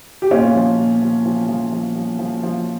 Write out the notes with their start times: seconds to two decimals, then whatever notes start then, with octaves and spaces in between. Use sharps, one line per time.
0.22 G4
0.31 A#2 C#4 F4
0.55 F3
0.78 A#2
1.02 F3
1.26 F3
1.49 F3
1.72 F3
1.96 F3
2.19 F3
2.43 F3